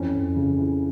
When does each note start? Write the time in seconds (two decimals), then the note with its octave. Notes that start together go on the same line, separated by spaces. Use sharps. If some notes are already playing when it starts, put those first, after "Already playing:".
Already playing: F2 E3 C#4
0.14 F2
0.36 C#3
0.59 E3